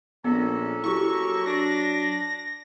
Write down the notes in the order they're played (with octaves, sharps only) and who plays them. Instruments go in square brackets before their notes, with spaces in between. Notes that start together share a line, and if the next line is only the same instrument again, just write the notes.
[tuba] A#1 [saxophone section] A#3 C#4 A4 [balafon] B3
[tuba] F#3 [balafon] E4 G4 [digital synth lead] C#6
[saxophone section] D4 [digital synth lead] A#6